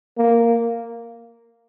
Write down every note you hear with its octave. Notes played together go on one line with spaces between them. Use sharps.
A#3